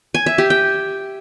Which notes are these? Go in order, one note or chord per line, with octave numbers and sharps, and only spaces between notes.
G#5
E5
G4
G5